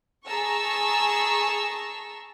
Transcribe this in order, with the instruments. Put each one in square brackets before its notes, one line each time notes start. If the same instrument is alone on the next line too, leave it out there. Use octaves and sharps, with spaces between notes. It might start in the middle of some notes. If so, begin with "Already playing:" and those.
[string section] G#4 A5 A#5 C#6 E6